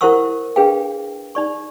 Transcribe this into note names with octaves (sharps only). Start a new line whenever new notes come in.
E4 A#4 C5 F#5 C#6 E6
D4 G#4 B4 F5 G5
D#4 D5 C#6